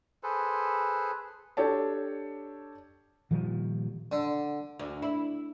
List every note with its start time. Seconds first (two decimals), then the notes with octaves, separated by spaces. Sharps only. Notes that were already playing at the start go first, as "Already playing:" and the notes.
0.23 G#4 A4 B4 C5
1.57 D4 G4 A4 C#5 A5
3.31 A#2 D#3 F3 G3
4.12 D3
4.79 D2
5.02 E4